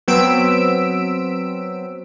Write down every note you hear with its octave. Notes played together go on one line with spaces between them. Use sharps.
F#3 B3 C4 E6 B6 D7